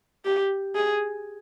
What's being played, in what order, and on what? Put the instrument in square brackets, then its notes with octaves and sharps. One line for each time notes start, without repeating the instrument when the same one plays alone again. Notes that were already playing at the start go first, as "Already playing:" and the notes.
[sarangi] G4
G#4